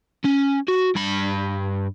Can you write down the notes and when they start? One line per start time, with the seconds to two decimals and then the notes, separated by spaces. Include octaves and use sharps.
0.24 C#4
0.68 F#4
0.96 G2 B5